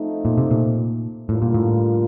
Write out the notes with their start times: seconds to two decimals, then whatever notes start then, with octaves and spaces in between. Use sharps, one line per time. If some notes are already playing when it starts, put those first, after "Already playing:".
Already playing: F3 A3 C4 D#4
0.25 A#2
0.38 C3
0.51 A#2
1.28 A2 D3 G3 A#3 F4
1.42 A#2
1.54 A2